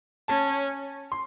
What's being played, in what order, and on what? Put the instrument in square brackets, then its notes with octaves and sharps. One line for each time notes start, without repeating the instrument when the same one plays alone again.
[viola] C#4 [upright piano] A5
[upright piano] C6